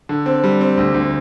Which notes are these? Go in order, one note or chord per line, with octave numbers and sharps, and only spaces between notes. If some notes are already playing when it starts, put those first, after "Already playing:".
D3
C4
G3
C4
D2
D2